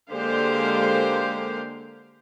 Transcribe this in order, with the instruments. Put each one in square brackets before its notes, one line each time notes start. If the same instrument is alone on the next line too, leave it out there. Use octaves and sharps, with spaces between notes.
[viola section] D3 G#3 A#3 G4 C5 F5